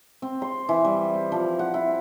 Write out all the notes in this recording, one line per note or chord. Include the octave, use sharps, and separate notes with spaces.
C4
C6
E3
G3
C5
F3
F#5
E4